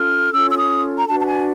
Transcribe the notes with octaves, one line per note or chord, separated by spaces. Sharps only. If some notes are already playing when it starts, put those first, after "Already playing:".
Already playing: C#4 F4 A4 F6
C#4 F4 A4 E6
E6
D#6
A#5
D4 F#4 B4 A5
A5
G#5